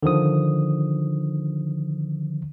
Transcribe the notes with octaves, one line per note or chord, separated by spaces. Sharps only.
D3 D#3 F3 D#6